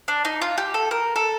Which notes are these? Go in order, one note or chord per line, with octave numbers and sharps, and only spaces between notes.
D4
D#4
F4
G4
A4
A#4
A4